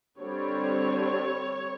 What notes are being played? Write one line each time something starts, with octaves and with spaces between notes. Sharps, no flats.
D3 G3 C4 C#5